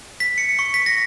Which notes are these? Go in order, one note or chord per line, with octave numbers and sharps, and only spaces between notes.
B6
C#7
C#6
B6
A#6